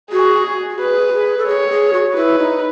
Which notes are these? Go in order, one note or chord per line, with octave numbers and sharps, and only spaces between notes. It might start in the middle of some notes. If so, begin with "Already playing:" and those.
F#4 G#4
F#4
G#4 B4
G#4
A4
G#4 C#5
G#4
F#4
E4 B4
D#4